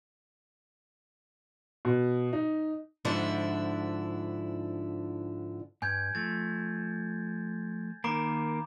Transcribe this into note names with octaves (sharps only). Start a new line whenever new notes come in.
B2
D#4
G#2 D3 F3 D4 E4
G2 G#5 G6 G#6
F3 A3 A6
D#3 A#3 A#5 B5 D6